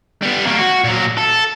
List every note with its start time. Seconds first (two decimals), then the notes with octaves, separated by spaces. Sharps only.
0.22 G3 B3
0.46 A3 A#3
0.58 F#4
0.84 A#2 F#3
1.18 A4